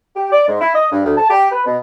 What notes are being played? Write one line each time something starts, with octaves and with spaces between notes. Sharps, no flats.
G4
D5
G#2
E4
D#5
G2
D2
A5
G4
B4
B2